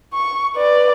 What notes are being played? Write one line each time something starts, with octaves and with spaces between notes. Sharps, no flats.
C#6
B4 D5